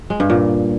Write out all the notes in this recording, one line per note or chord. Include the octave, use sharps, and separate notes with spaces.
G#3
G2
A#2